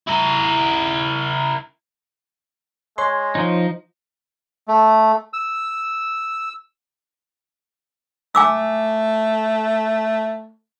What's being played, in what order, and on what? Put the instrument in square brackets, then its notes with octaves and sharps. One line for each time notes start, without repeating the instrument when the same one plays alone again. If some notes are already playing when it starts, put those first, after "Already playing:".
[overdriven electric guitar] E4 A#4
[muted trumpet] G#3 [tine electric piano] C#5 C6
[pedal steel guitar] F3 D#4
[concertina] A3
E6
[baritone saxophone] A3 [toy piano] G#5 D6 E6